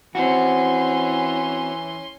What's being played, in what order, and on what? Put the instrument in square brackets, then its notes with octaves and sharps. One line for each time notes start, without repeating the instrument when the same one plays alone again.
[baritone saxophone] E3 [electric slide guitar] C4 F#4 [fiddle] C#4 C6